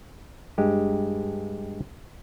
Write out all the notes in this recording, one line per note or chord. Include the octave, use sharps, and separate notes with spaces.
G2 G#3 G4